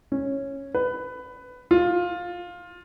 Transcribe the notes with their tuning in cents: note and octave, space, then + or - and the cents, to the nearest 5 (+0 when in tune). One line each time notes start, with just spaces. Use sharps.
C#4 -10
B4 +15
F4 +15